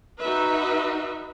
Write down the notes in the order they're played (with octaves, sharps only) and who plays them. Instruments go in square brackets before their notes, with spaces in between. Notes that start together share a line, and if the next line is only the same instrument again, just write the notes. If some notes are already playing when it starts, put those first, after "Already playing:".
[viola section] D#4 F#4 B4 E5